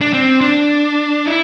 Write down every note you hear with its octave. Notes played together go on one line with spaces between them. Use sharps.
D4
C4
D4
E4